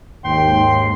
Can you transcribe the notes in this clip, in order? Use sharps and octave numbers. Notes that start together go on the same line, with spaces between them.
D#2 G#2 G5 C6